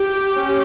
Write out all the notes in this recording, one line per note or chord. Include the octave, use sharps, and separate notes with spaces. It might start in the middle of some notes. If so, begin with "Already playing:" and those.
Already playing: G4
C#4